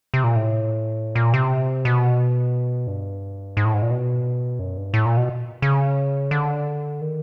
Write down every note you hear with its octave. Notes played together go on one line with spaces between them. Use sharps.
C3
A#2
A2
A#2
C3
B2
G2
G#2
A2
G#2
A#2
B2
F#2
G2
A2
A#2
B2
C#3
D3
D#3